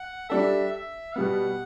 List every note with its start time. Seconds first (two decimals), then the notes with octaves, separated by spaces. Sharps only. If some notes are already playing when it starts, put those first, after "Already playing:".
Already playing: F#5
0.29 G3 D4 A4 E5
0.73 E5
1.16 B2 G3 B3 F#5